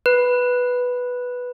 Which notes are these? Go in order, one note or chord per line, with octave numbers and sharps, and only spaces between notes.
B4